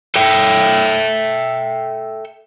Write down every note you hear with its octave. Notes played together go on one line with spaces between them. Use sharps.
A4 E5 G5